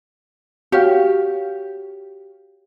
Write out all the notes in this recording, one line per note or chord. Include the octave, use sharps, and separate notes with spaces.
F#4 G4 C#5 F5